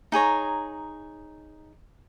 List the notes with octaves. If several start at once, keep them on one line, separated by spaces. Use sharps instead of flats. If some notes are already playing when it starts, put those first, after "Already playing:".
D#4 G#4 C#5 A#5